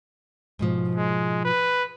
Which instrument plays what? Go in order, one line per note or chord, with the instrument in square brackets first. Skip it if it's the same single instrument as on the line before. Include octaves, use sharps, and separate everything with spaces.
[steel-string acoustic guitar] G#2 B2 F3
[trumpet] G#3
B4